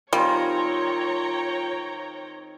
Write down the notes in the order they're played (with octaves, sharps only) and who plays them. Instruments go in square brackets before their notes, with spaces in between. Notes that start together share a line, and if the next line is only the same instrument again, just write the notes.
[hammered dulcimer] D#3 C4 G#4 [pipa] G3 [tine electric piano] F4 [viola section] C#5 G5 A#5